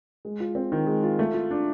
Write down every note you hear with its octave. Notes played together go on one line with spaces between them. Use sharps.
G#3
F4
C4
D#3
G#3
F4
A3
F4
D4